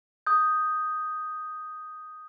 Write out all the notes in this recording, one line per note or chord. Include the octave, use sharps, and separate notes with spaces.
D#6 G6